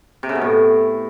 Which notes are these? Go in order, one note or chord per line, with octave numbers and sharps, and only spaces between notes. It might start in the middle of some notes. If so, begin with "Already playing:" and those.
C3
C#3
B2
A2